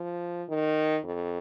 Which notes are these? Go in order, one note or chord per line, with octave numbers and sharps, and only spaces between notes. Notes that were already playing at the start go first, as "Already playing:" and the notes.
Already playing: F3
D#3
F2